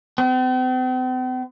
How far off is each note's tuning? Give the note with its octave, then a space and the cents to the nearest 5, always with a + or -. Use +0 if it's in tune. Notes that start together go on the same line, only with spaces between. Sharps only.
C4 -45